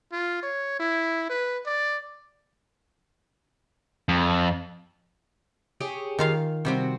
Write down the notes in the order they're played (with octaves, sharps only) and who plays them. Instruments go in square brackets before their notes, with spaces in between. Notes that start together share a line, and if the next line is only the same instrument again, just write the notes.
[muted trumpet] F4
C#5
E4
B4
D5
[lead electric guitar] F2
[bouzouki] G4 G#4 C#5
[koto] D#3 F4 F5
[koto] C3 G3 [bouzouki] C4 F#4